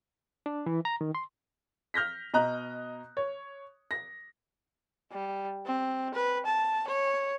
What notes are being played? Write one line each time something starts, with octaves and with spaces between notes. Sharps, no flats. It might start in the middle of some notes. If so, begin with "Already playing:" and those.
D4
E3
A#5
D#3
C6
F6 G6 A#6 B6
B2 D#5 A#5 F#6
C#5
A#6
G3
C4
B4
A5
C#5